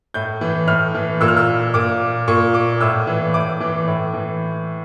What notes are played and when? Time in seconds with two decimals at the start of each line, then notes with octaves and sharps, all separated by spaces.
0.14 A2 G6
0.41 E3
0.67 A2 F6
0.95 E3
1.21 A#2 E6
1.28 F6
1.37 E6
1.74 A#2 D6
2.28 A#2 C#6
2.54 D6
2.81 A2 E6
3.07 E3
3.34 A2 D6
3.60 E3
3.87 A2
4.14 E3